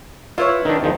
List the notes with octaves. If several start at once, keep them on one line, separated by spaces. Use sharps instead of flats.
E4 F4 B4 C#5
D#3 D4
E2 D#3 F3